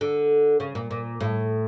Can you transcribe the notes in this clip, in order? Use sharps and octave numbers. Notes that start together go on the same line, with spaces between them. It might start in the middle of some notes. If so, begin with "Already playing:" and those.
D3
C#3
A#2
A#2
A2